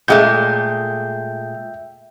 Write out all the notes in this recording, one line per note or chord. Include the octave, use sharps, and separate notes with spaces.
A#2 G#3 A3 E5 G5 G6